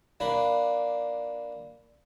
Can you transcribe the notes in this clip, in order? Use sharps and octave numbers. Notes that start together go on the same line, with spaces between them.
A#3 D4 B4